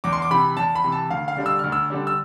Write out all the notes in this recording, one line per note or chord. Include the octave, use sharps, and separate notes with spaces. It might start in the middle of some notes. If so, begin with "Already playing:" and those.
E2 D6
C6
D6
C3 E3 B5
E2 A5
B5
C3 E3
A5
D2 F5
F5
D3 G3 D4
E6
D2 F6
E6
D3 G3 D4
E6